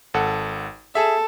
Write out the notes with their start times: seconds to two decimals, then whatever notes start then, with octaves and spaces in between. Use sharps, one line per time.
0.14 G#1 A4 F#5
0.95 G#4 A4 E5